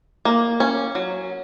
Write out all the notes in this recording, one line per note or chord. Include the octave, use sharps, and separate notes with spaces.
A#3
C#4
F#3